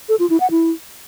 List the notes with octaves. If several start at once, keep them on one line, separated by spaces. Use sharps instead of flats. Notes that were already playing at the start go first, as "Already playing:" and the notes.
A4
F4
E4
F#5
E4